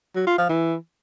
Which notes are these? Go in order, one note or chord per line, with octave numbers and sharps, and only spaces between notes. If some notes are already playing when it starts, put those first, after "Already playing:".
F#3
F4
F3
E3